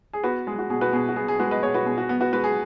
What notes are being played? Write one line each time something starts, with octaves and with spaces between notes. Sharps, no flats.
G#4
B3 F#4 B4
G#3 G#4
F#4
B2 G#4
F#4 B4
B2 G#4
F#4
B3 G#4
G#4
G#3 F#4 B4
B4 D#5
B2 G#4 C#5
F#4 B4
B2 G#4
F#4
B3
F#4 B4
G#3 F#4 B4
G#4